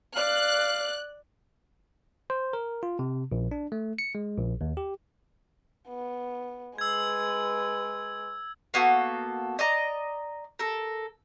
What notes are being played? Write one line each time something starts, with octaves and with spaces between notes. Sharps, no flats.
D5 F5 F#6
C5
A#4
F4
C3
A#1
D4
A3
C#7
G#3
A#1
D#2
G4
B3
G#3 B4 E6 G#6
A#3 B3 F#4 A4
D5 D#5 A#5
A4 A#4